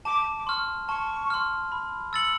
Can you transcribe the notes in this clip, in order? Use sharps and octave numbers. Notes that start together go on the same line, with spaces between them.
A5 D6
D6
C6 C#6 F6
A5 C#6
C6 F6
B5
E6 A6 C#7 F#7